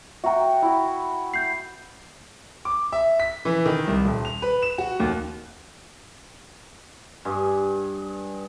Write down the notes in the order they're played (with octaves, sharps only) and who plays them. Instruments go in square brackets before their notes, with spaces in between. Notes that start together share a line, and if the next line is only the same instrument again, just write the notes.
[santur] F#4 G5 [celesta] E5 A#5
[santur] E4 F#4
[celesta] G6 C7
[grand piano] D6
E5
B6
E3
D#3
C2
D#1
F7
B4
E7
F#4
D#2
[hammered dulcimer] G2 G#4